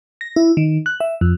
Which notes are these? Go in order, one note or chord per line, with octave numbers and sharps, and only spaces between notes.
A#6
E4
D#3
F#6
E5
F2